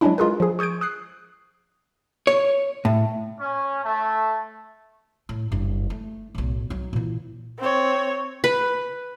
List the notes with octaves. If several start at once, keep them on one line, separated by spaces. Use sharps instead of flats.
F#3 G#3 C#4 D4 E4
G#3 F4 G#4 A#4 B4
F3 G#4
C#6 D#6 G6 G#6 D7
D#6 F#6 C7
C#5
A2
C#4
A3
A2
F#1 G2
A3
B1 A2
F#3 D#4
A#2 E3
C4 C#5
B4